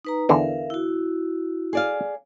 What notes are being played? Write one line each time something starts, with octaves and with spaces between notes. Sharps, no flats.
D#4 B4 A#5
E2 D3 E3 A#4 E5 F5
E4 F#4
G#4 D5 F5